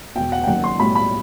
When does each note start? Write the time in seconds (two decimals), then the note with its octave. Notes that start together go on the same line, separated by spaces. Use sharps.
0.15 E1 E2 B2 G5
0.32 F#5
0.44 G5
0.47 F#1 F#2 D#3 F#5
0.64 C6
0.79 B1 A2 G3 B5
0.95 B5